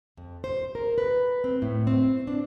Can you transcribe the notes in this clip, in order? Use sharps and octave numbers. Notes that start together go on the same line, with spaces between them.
F2
C5
A#4
B4
C4
A2
C4
D4